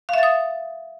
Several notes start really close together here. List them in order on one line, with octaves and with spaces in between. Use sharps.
F5 E5 A6 D#6